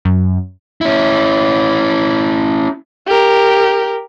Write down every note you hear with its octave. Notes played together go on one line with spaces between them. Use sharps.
F#2
C#4 E4
G4 A#4